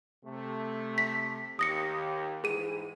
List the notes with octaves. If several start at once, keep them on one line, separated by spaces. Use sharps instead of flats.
C3 A3
B6
D#2 G4 D#6 A#6 C#7
G#2 E3 G#4 D#7